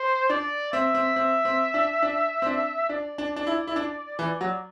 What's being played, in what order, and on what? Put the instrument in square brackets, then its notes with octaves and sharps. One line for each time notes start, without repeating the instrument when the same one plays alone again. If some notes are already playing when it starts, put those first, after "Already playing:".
Already playing: [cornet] C5
[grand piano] D4 [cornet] D5
[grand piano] C4 [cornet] E5
[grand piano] C4
C4
C4
D4
D4
C4
D4
[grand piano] D4 [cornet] D5
[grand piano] D4
D4
E4
E4
D4
E3
F#3